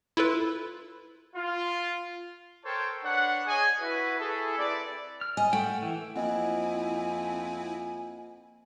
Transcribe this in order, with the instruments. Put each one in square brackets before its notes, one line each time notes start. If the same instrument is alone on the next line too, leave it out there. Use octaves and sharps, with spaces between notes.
[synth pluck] E4 F4 A4 B4
[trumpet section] F4
A4 A#4 C5 C#5 G5 A5
D4 B4 C#5 F#5
G#4 C#5 D#5 G#5
E4 F#4 B4
E4 G#4 A4
C4 E4 B4 D5
[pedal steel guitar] F6
[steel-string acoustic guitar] D#5 [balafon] G#5
[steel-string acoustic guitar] A3 [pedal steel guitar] F#5 G5
[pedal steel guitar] E3
[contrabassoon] F2 [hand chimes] A#3 D#5 F#5 [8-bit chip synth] C4 E4 [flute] G#5